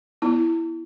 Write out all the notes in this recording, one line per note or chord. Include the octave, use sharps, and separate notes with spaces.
B3 E4